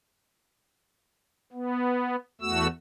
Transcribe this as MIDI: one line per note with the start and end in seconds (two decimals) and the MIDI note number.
1.52 2.16 59
2.41 2.67 40
2.41 2.67 57
2.41 2.67 66
2.41 2.67 88